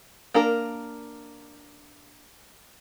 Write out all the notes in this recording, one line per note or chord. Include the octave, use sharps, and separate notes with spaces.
A#3 D4 A#4